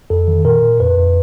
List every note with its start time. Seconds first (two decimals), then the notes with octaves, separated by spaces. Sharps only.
0.10 F2 A4
0.28 D#3
0.45 A#2 A#4
0.62 A#2
0.80 F2 B4
0.98 F2